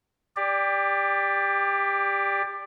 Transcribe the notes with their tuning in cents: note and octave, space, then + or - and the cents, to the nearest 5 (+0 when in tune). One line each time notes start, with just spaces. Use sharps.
G4 +20 D5 +0